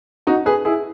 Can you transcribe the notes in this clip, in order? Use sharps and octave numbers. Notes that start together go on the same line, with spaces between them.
D#4 F#4
G#4 B4
E4 G#4